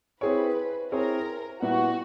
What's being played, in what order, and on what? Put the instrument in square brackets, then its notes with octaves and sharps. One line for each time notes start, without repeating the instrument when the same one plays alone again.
[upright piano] C4 E4 G#4 C#5 [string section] B4
[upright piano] C4 E4 G#4 C#5 [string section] A#4
[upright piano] A#2 G3 B3 E4 G4 [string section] F#4